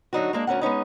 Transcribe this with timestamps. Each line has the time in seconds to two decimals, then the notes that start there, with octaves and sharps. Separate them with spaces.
0.13 D3 F#3 D#4 F#4
0.33 G#3 A#3 D4
0.47 D2 C#4 A#4 F#5
0.61 G#3 B3 C#4 D#4